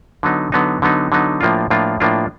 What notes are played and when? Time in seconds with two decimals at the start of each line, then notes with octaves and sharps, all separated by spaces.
0.23 D3 F#3 B3 D#4
0.52 D3 F#3 B3 D#4
0.82 D3 F#3 B3 D#4
1.12 D3 F#3 B3 D#4
1.41 A2 F3 A#3 D4 F4
1.70 A2 F3 A#3 D4 F4
2.00 A2 F3 A#3 D4 F4